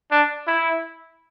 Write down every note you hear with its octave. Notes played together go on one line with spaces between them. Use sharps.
D4
E4